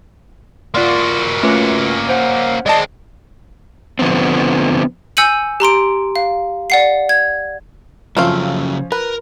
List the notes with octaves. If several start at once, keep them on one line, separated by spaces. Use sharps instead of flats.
A#3 F4 F#4 D5 C6
A3 C#4 F4 B4
C5 F#5
G#3 C4 D5 D#5 A5
D3 F3 G3 B3 C4
G#5 E6 G6 C#7 D#7 F#7
G4 A#5 C6 D7
F5
D5 F#5 C7
G#6
C#3 F3 F#3 A3 C4 C#4 F4 F5
A#4 B4